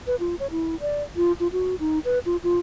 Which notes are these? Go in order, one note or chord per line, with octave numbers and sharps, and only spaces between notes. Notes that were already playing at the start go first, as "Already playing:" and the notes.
B4
F4
C#5
E4
D5
F4
F4
F#4
D#4
B4
F4
F4